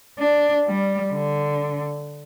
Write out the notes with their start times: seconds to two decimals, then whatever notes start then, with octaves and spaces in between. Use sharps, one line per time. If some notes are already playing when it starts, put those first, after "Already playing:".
0.19 D4
0.67 G3
1.14 D3